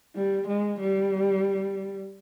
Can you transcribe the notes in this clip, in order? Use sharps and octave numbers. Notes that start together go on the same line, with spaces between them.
G3
G#3
G3